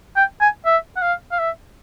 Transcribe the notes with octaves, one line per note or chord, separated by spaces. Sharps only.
G5
G#5
E5
F#5
F5
F5
E5